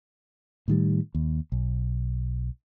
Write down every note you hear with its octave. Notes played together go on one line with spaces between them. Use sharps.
A2 D#3 G3
D#2
B1